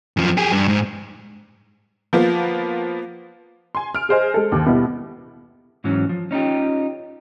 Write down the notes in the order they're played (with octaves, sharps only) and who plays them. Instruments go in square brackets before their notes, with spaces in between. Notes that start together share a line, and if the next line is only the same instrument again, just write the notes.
[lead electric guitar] F#2 F3
G4 G#4
G2
G#2
[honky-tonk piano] F3 A#3 B3 F4
G#5 C6
F6 D7
G#4 C5 D#5 G#5
G#3 A4
D#2 D6
B2 G3 B3 E4
[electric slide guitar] G#2 E3 F#3 C#4
F3
C#4 D#4 F4 G4